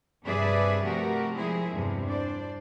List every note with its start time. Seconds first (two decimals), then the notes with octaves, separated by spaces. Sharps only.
0.24 G2 C3 G#4 B4 D5 E5
0.84 C3 F3 A3 F#4 G4 A#4
1.33 F3 G#3 C4 E4 G#4
1.73 E2 G2 C3
2.05 D4 C5 D5